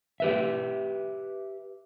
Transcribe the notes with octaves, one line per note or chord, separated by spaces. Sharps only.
G4 B4 E5